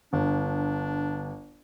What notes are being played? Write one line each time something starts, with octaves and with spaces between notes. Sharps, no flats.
G1 D4